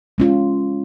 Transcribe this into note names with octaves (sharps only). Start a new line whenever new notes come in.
G#3 C#4 F4